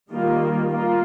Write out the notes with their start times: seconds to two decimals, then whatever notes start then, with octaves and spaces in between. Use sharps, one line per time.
0.13 D#3 G3 A#3 F4
0.71 A#3 F4